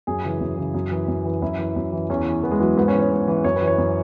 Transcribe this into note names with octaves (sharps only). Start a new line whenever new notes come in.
F#2 G#4
C#3 E3
F#2
C#3 E3
F#2
E3
F#2
E3
F#2 E4
E3
F#2
E3
E2 C#4
E3
E2 B3
G#3
E3 F#3
G#2 B3
C#4
E3
C#5
G#2
E3
F#2 C#5
B4
E3
C#5
F#2